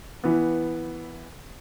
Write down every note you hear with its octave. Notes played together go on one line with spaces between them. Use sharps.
E3 B3